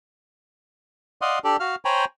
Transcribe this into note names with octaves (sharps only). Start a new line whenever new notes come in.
D5 D#5 F5 F#5 C6 D#6
D4 G4 A4 D5
F#4 F5 F6
C5 C#5 G5 G#5 A#5 B5